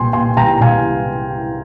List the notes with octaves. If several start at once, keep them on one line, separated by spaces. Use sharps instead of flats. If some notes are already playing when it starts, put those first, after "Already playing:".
Already playing: C2 A#2 G5 G#5 C6
A#2 G#5 C6
C2 G5 A#5
C2 F5 G#5